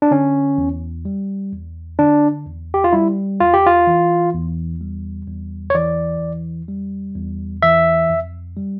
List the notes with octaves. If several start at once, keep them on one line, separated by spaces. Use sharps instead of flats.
D4
D3 C#4
E2
G3
E2
D3 D4
E2
G4
F4
G3 E4
E2 F4
G4
F4
E3
E2
G3
E2
C#5
E3 D5
E2
G3
E2
E3 E5
F2
G3